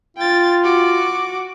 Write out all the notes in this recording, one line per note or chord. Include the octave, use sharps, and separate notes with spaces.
F4 G5 A6
F#4 D6